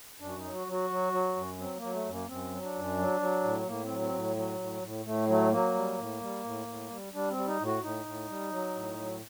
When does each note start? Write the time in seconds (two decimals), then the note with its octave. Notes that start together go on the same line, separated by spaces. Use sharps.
0.20 F#2 D4
0.29 F#4
0.38 D#4
0.44 F#3
0.55 F#4
0.67 F#3
0.72 F#4
0.90 F#3
1.12 F#3
1.36 F#2
1.59 F#3 C4
1.76 A#3
1.82 F#3
1.93 A3
2.06 F#2
2.11 A#3
2.28 F#2 C4
2.51 F#3
2.63 D4
2.74 F#2
2.98 F#3
3.20 F#3
3.44 A2
3.67 A2 A#3
3.84 C4
3.90 F#3
4.01 C4
4.13 A2
4.36 F#3
4.59 A2
4.82 A2
5.06 A2 A3
5.28 F#3 A3
5.51 F#3 A#3
5.75 G3
5.98 A2
6.21 G3
6.44 A2
6.67 A2
6.90 G3
7.13 G3 D4
7.31 C4
7.36 G3
7.47 D#4
7.60 A2
7.65 F#4
7.83 A2 D#4
8.06 A2
8.29 G3
8.52 F#3
8.75 A2
8.98 F#3